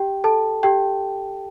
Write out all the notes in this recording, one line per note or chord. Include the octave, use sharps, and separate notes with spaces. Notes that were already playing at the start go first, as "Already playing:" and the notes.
Already playing: G4 G5
A4 A5
G4 G5